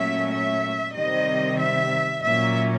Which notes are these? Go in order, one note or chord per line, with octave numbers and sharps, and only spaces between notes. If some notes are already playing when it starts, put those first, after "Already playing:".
Already playing: A#2 F#3 A3 C#4 E5
E5
C3 D#3 G3 C4 D#5
E5
A#2 F#3 A#3 C#4 E5